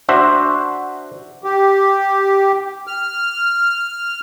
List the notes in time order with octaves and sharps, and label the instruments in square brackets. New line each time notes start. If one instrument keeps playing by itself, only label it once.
[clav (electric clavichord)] D4 F#4 C5 E5
[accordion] G4
F6